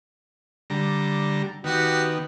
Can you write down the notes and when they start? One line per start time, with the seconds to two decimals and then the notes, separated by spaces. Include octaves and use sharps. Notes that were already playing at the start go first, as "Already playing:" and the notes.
0.70 D3 G3 A#5
1.64 D#3 B3 F#4 G4